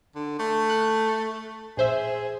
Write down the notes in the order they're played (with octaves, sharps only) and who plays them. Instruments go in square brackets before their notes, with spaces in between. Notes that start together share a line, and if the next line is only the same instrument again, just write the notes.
[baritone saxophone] D3
A3
[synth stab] F#6
[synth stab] A#1 C5 E5 [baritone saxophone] G#4